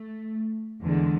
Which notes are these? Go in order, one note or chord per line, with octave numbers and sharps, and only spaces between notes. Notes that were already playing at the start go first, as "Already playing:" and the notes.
Already playing: A3
E2 D3 G#3